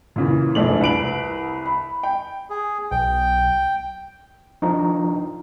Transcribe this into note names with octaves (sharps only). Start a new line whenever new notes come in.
A#2 C#3 E3
E1 A#1 A3 D4 G#5 F#7
C2 B4 D7 F#7
B5
G5
G#4
B1 G5
F3 D4 D#4 F4